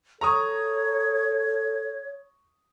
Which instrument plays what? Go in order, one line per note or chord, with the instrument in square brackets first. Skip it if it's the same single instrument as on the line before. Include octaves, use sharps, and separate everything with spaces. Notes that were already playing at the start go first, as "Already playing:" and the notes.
[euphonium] A4 [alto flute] C#5 [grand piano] A#5 C#6 D#6